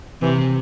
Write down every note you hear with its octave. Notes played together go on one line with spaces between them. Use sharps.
C3 E3